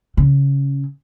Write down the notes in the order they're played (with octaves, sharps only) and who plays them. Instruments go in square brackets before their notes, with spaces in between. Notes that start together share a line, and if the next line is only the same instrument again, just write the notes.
[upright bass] C#3